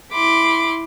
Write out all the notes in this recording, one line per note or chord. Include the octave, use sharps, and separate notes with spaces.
E4 B5 C6 D6